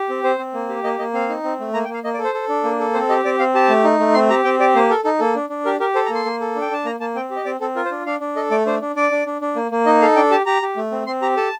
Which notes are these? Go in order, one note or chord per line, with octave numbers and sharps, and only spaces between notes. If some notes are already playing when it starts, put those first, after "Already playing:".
Already playing: G4
C4
C4 C5
C4
A#3
G4
A#3 D#5
A#3 D#5
C4 F5
D#4
C4
A3
A#3 A#5
G5
A#3
F5
A#3 D#5
D5
A4
C5
A4
D4
A#3
A4
C4 C5
G4 D#5
C4 D5
C4 F5
G4 A5
A3
D#4
A3
C4 C6
G4 A#5
C4 G5
G4 D5
A#3 C5
A4 A#4
D#4 A4
A#3 A4
D4
D4
G4 A#4
G4 A#4
A4 C5
A#5
A#3 C6
A#3
A4
D4
G5
D4 A5
A#3 A#5
A#3 A5
C4 G5
G4
D#5
C4 D5
C4 A4
F4 A#4
C5
D4
D4 F5
D4
A4 D#5
A3 D5
D4 C5
D4
D4 D5
D4
D4
D4
A#3
A#3
D#4 D#5
A4 F5
D4 G5
G4 A5
G4 A#5
G4
A3
C4
C4 C6
G4 A#5
A4 A5